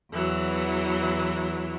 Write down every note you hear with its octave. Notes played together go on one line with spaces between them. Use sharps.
E2 E3 F#3